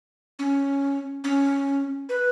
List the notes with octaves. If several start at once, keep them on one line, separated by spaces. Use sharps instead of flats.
C#4
C#4
B4